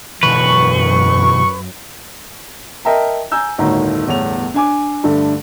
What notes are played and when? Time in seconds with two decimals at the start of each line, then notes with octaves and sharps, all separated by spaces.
0.23 F#2 B2 D3 E3 B4 C#6
2.85 A#4 D#5 E5 G5 A5 A#5
3.32 G#5 A#5 E6 G6
3.58 G1 D2 A2 D#3 A#5
4.07 G1 E2 A2 F7
4.54 D4 G#5 D6
5.04 G2 D3 A3